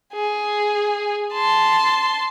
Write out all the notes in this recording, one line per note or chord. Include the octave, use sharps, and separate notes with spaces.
G#4
A5 C6